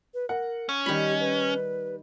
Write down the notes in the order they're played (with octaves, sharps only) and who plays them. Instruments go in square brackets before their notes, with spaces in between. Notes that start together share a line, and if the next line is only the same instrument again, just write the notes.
[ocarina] B4
[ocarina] A#4 [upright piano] F#5
[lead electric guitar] C#4
[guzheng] D#3 B5 [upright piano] G3 [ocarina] G4
[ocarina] B4